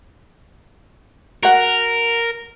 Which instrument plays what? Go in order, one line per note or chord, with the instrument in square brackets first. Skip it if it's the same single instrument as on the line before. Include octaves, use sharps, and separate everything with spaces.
[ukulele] F#4 F#5 [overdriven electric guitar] A#4